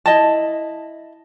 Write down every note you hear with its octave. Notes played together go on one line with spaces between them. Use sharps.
E4 D#5 A5